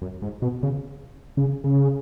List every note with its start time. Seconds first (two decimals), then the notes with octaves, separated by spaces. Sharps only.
0.02 F#2
0.22 G#2
0.42 B2
0.63 C#3
1.37 C#3
1.64 C#3